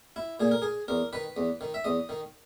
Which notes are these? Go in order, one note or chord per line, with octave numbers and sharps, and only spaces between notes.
E4
A#2 G#4
A#4
G#4
E2 A#4
D#3 B4
E2
D#3
E5
E2 D#5
D#3